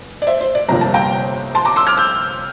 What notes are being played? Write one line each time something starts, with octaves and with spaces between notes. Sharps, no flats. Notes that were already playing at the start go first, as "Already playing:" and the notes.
Already playing: F1
D5
C5 E5
C5
D5
G1 F2 C3 G3 A#3 A#5
A5
G5 A#5
A5 C6
A#5 D6
C6 E6
D6 F6
E6 G6